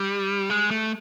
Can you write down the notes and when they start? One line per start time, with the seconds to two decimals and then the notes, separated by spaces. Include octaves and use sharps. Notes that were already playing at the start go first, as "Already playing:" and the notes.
Already playing: G3
0.50 G#3
0.71 A3